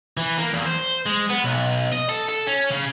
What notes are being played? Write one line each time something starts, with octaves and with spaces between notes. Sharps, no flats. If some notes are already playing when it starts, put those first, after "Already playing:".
E3
A#3
E2
C5
G#3
B3
B1
D#5
A4
A4
C#4
C#3